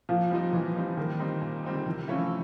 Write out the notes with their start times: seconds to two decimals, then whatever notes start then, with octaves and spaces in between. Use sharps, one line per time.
0.09 A#2 F3
0.31 F3 G3 C4 D#4
0.53 A#2 E3
0.76 G3 C4 D#4
0.97 A#2 D#3
1.19 G3 C4 D#4
1.42 A#2
1.64 G3 C4 D#4
1.75 D#3
1.86 C3 E3
2.08 E3 F3 A3 C#4 E4